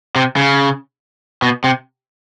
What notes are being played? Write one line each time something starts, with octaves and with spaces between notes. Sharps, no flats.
C3
C#3
B2
C3